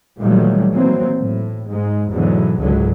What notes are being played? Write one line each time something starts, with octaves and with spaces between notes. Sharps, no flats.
A#2 D#3 E3 F#3 G3 A3
D#3 E3 F#3 A#3 C4
A2
G#2 G#3
E2 G#2 B2 D3 E3 F#3
G#1 C#2 G#2 D3 F#3 G#3